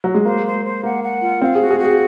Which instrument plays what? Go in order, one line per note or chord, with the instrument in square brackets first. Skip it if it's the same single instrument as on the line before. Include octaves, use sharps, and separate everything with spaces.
[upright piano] F#3
G#3
[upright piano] A#3 [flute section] C5
[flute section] C5
C5
[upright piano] A#3 [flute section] F#5
[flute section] F#5
F4
[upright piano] C4 [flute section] F5
[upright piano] G#4
[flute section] F#4
[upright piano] G#4
[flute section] F#4
[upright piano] G#4